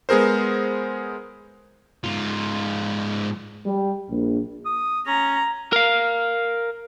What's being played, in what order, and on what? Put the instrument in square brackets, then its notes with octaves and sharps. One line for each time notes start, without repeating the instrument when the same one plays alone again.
[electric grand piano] G#3 B3 G#4 A#4 C5
[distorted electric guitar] G#2 F4
[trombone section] G3
A#1
[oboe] D#6
[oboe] C#4 [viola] A#5
[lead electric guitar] A#4 F5